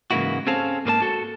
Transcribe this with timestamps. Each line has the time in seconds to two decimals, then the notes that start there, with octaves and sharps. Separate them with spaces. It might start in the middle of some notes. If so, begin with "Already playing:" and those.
0.11 G#2 C#3 E3 A#3 E4 F#4
0.47 C4 C#4 G#4 A4 C5 F5
0.85 G#2 A#3 B4 A5
1.02 F#4 A4